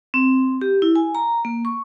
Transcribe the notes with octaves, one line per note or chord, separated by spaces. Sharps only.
C4
G4
E4
G#5
A#5
A#3
C#6